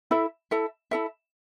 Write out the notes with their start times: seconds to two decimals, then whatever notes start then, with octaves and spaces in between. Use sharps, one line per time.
0.11 E4 A4 E5
0.51 E4 A4 E5
0.91 E4 A4 E5